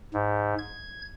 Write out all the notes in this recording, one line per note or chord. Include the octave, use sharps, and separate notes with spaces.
G#2
G#6